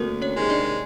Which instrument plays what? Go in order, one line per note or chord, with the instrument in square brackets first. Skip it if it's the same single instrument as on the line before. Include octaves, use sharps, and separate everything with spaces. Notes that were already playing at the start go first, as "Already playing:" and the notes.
Already playing: [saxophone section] D2 [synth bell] A#3 C4 A#4
[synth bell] C#4 C#5
[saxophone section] C3 D#3 G#3
[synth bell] D4 D5